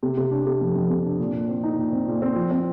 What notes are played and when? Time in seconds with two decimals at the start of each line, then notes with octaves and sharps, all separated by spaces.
0.03 C3
0.17 C3
0.31 D4
0.46 C3
0.61 F2
0.75 F2
0.90 C3
1.05 D4
1.19 A#2
1.34 A#2
1.49 C4
1.64 D#4
1.78 A#2
1.93 C4
2.08 A#2
2.22 C4
2.36 F3
2.51 C4